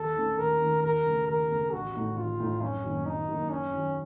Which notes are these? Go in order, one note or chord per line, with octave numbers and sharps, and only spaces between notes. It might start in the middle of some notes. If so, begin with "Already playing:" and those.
Already playing: D#2 A4
D#3 A3 C#4
D#2 A#4
D#3 A3 C#4
D#2 A#4
C#3 A3
D#2 A#4
C#3 A3
A1 F#4
A2 A3 D#4
A1 F4
A2 A3 D#4
F#1 C#4
F#2 D#3 A#3
F#1 D#4
F#2 D#3 A#3
F#2 C#4
D#3 F#3